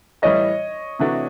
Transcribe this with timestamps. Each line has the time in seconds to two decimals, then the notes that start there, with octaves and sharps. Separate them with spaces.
0.22 A2 E3 G3 C#5 D#5
0.99 C3 E3 A3 D4 F#4